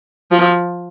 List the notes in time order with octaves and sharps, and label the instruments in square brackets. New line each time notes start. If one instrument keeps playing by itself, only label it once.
[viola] F3